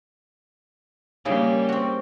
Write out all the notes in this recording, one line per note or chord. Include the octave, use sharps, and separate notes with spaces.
C#3 G3 A#3 E4 G#4
C4 F#4